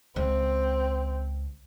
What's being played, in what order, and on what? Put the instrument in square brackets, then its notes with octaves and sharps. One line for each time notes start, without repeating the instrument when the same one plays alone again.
[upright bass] C#2 [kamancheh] C4